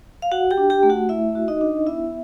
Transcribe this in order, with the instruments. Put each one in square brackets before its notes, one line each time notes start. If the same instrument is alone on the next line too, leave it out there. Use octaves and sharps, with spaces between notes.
[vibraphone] F5
F#4 F#5
G4 G5
D4
G4 G5
A3
F#4 F#5
A3 E4 E5
F#4
D#4 D#5
D4
B3 E4 E5